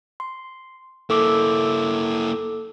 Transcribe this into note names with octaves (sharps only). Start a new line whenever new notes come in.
C6
A#3 E4 A4 D6